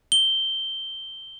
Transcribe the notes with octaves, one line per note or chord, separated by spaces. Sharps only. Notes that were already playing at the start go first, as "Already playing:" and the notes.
G7